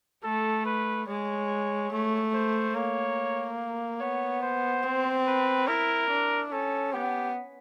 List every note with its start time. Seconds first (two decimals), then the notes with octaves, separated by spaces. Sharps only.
0.24 A3 A4
0.66 B4
1.08 G#3 C#5
1.92 A3
2.34 C5
2.75 A#3 C#5
4.00 B3 C#5
4.43 C5
4.84 C4
5.26 B4
5.68 E4 A#4
6.10 D4
6.52 C#4 A4
6.93 B3 G4